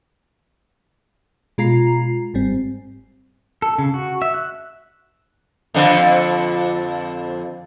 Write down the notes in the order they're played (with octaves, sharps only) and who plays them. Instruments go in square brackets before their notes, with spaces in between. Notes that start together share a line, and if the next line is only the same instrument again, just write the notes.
[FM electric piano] B2 G#3 F4 A#5 C7
G1 G#2 G3 C4
[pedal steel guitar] A4
C#3
F#4
E5
F#6
[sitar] F2 D3 C4